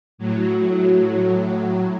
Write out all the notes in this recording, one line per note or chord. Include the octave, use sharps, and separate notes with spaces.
A2 F#3